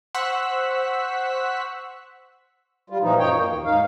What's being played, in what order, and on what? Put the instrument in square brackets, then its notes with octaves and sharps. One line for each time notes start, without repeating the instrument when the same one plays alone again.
[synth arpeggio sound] C5 F#5 C#6 E6 F#6 B6
[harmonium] G3 F4
A#2 E3 F3 D#4
F#2 F3 D#4 C#5 G5
A#3
D#2
G#2 D#4 F5